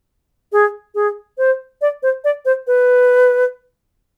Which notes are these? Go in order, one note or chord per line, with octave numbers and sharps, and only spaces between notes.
G#4
G#4
C5
D5
C5
D5
C5
B4